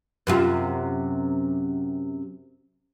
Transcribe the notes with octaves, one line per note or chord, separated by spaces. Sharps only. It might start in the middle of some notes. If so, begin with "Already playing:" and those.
F#2 C3 F4